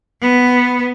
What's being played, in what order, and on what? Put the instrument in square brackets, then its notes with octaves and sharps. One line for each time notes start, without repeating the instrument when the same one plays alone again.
[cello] B3